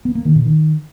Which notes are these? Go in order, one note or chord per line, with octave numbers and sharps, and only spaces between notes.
B3
A#3
D#3
A#2
D#3